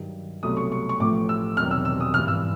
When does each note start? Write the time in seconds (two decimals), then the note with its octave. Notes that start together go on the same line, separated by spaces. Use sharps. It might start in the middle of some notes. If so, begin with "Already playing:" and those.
Already playing: G2 D#3 F#3
0.43 C2 B2 F#3 A3 D#6
0.57 C#6
0.72 C#6
0.89 C#6
0.99 A1 A2 F3 A3 D6
1.29 E6
1.57 E1 E2 C3 D#3 F#3 F6
1.71 E6
1.85 E6
2.00 D#6
2.14 G#1 G2 E3 F6
2.28 E6